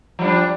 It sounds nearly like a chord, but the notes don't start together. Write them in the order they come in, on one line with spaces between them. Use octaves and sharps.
F3 G3 D4